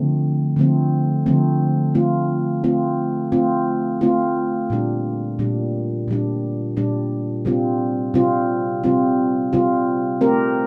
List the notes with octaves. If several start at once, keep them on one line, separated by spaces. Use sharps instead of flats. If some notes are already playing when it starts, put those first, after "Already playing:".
Already playing: D3 F3 A3 C4
D3 F3 A3 C4
D3 F3 A3 C4
A3 C4 F4
A3 C4 F4
A3 C4 F4
A3 C4 F4
A#2 G3 D4
A#2 G3 D4
A#2 G3 D4
A#2 G3 D4
C3 G3 C4 F4
C3 G3 C4 F4
C3 G3 C4 F4
C3 G3 C4 F4
A3 C4 G4 A#4